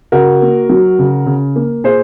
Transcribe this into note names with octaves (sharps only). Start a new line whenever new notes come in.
C#3 F#4 A#4
A#3
F#3
C#3
C#3
A#3
A#2 G#4 C5